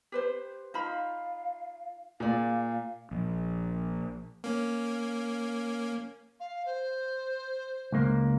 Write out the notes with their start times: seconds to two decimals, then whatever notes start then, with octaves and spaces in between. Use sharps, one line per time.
0.12 G4 B4 C5
0.74 D#4 F4 F5 B5
2.20 A#2 G#4 D5 F5
3.11 A#1
4.44 A#3 C#4
6.40 F5
6.66 C5
7.92 C#2 A#3